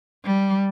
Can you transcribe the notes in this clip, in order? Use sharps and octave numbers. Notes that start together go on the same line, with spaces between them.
G3